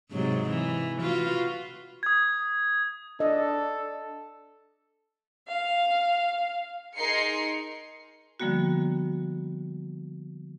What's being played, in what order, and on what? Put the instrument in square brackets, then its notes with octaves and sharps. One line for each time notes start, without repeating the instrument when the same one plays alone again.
[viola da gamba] G#2 C3 F#3
E3
F4 F#4 B4
[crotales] D#6 G#6
[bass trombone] D4 [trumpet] A4 [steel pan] D#5
[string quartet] F5
[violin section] D#4 G#4 A#4 C6 C7 C#7
[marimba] D3 F3 G3 A#3 B3 F#4